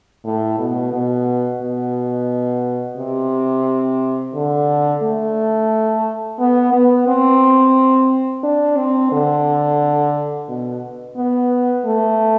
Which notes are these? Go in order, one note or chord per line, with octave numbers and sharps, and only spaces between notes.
A2
B2
B2
B2
C3
D3
A3
B3
B3
C4
D4
C4
D3
B2
B3
A3